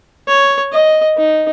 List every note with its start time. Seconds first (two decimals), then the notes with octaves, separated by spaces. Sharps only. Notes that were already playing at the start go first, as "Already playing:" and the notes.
0.28 C#5
0.72 D#5
1.18 D#4